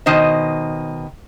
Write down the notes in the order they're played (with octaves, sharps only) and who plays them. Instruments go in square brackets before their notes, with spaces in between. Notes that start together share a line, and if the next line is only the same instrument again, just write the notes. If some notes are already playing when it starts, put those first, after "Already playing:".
[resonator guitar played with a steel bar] B2 D#3 C5 D#5